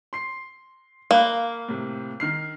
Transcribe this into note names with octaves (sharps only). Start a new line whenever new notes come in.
C6 C7
A#3 F5 B5 F#6
A2 C3
D#3 F6 C7